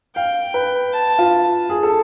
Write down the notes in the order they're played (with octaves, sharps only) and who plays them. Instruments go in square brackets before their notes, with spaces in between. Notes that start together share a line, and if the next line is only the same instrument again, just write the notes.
[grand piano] F5 [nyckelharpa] G5
[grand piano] B4
[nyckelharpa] A5
[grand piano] F4
G#4
A4